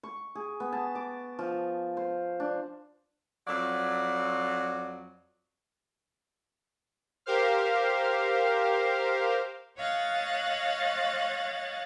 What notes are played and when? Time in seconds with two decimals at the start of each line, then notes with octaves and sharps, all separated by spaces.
0.03 C#6
0.35 G#4
0.60 B3
0.72 A5
0.95 D6
1.39 F3
1.97 C5
2.40 D4
3.47 F2 F#3 D5
7.26 G4 A#4 C5 F5
9.77 C#5 D#5 F5 F#5 F#6 A6